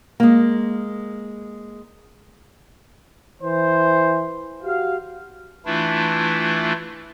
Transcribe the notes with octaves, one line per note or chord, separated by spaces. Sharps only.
G#3 A#3
E3 C5
F#4 G4 F5
E3 A3 D4 E4 F4